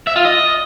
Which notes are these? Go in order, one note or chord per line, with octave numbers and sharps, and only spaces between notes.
E5
F4
D#5